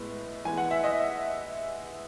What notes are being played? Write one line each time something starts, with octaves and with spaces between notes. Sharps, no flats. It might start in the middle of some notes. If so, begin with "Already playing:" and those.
Already playing: A2 G#3 B3
E3 G#3 B3 G#5
F#5
E5
D#5